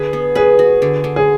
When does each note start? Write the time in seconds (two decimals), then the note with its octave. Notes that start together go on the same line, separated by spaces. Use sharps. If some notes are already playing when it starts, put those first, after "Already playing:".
Already playing: D3 G#4 B4
0.13 B3
0.35 G#4 B4
0.59 F#4
0.82 D3
1.04 D3
1.16 G#4